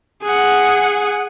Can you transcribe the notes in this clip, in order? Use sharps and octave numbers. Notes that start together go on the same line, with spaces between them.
G#4 F#5